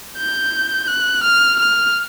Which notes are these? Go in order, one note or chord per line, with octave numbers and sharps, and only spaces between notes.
G6
F#6
F6
F6